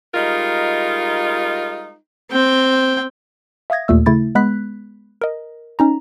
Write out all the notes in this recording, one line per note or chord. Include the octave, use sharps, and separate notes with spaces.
G3 G#3 D#4 F4 A#4
C4 G5
E5 F5 D#6 G#6 A#6
D#2 A#2 A3 E6
C#3 A3 E4 A6
G#3 B3 B5 F#6 B6
A#4 D#5
C#4 D#4 A#5